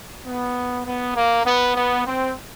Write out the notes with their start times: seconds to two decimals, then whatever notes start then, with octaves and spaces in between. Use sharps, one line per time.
0.26 B3
0.86 B3
1.15 A#3
1.45 B3
1.76 B3
2.06 C4